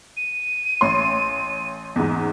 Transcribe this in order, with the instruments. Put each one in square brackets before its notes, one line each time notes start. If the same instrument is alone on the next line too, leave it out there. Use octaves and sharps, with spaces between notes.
[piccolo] D#7
[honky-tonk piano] A1 C#5 C6
E2 G#2